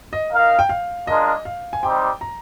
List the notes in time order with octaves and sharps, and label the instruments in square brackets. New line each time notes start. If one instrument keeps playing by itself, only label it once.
[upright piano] D#5
[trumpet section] D#4 A#4 F5
[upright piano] G5
F5
[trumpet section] G#3 D4 F4 A#4 [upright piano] D#5
[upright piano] F5
G#5
[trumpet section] G3 C4 D#4 G4 C5 [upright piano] G5
[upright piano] A#5